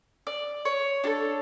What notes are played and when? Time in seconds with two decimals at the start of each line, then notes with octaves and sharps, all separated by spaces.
0.27 D5
0.65 C#5
1.04 D4 F#4 A4